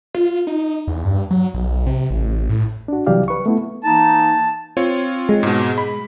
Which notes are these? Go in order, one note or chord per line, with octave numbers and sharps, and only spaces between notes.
F4
D#4
E2
G2
F#3
B1
C3
A1
A2
D4 F#4
C2 E3 F#3 G4 D5 F5
B4 C#6
A3 B3 E4
E3 A#3 D#4 A5
C4 F4 C#5
G#3
G#2 B2
B5